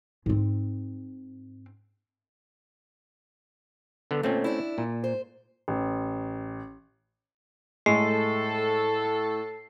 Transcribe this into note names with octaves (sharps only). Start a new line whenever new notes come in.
G#2 C4
D3 B3
D2 A#2 A3 C4 C#4
D4 E4
A#2
C5
A1
A2 G#3 A4 C7